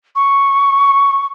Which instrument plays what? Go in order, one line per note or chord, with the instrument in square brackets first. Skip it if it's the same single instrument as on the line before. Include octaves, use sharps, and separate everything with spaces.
[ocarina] C#6